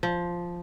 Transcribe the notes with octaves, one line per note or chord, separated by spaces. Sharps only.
F3